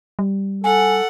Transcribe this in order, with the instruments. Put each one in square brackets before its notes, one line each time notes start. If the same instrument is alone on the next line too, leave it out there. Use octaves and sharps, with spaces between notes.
[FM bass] G3
[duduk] A4 [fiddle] F#5 [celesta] G#5